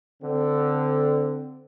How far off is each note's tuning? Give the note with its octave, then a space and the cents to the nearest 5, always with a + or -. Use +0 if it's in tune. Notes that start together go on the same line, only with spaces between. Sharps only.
D3 +0 C4 -20